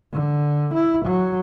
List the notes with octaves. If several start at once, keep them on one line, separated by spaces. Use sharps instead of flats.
D3
E4
F#3